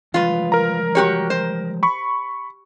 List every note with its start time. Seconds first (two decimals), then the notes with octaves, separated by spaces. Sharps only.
0.14 E3 F3 G#3 F4 B4
0.52 A#4 A#5
0.95 F#4 G4 C#5
1.30 C5
1.83 B5 C#6